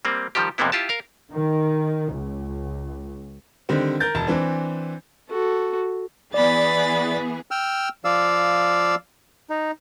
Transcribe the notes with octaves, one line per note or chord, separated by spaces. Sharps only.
G3 A#3 C4
D#3 F3 G3 G4
F2 C3 E3 A#3 B3 E4
E4 F4 G4 A5
A#4 F5
D#3
C#2
D3 D#3 G3 C4
A#4 G6 A6
E1 A5
E3 C4 D4
F#4 A4
E3 B3 G#4 D5 B5 A6
G5 E6 F6
F3 D5 F5 E6
D#4